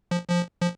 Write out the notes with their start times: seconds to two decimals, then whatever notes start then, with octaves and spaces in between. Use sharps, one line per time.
0.11 F3
0.30 F3
0.61 F3